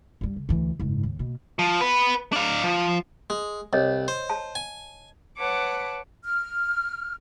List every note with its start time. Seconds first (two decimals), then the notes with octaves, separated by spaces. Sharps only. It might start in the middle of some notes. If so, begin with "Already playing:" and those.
0.21 G2 G3
0.36 C#3
0.49 D2 E3
0.80 F#1 G#2
1.03 D#2
1.19 B2 A#3
1.59 F3
1.81 B3 B4
2.33 D4 F5
2.63 F3
3.30 G#3
3.73 C2 C#5 D#5
4.08 C5
4.30 A5
4.55 G#5
5.37 B4 C#5 F#5 A5 D6
6.25 F6